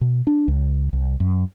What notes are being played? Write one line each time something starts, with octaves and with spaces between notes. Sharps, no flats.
B2
D4
C#2
C2
F#2